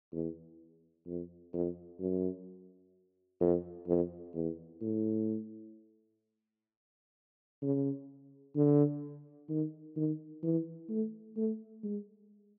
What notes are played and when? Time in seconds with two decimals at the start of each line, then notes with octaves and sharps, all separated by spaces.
0.13 E2
1.06 F2
1.53 F2
2.00 F#2
3.40 F2
3.87 F2
4.34 E2
4.81 A2
7.62 C#3
8.56 D3
9.49 D#3
9.97 D#3
10.43 E3
10.89 A3
11.36 A3
11.83 G#3